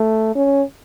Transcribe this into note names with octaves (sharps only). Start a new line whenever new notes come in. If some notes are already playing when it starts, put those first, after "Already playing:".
Already playing: A3
C#4